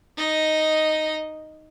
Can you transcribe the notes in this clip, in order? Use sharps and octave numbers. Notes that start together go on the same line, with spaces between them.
D#4 D#5